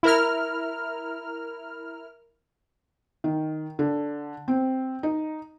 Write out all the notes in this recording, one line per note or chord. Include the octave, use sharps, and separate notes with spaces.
E4 A#4 F6
D#3
D3
C4
D#4